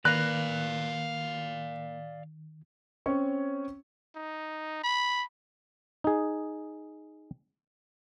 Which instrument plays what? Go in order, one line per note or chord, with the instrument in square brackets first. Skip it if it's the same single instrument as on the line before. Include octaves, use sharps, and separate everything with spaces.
[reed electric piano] D#3 [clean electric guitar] A#3 B4 A#5 [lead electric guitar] D5 F5 [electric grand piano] F#6
[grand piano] C4 C#4 C#5 C#6
[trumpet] D#4
B5
[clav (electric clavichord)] D#4 G#4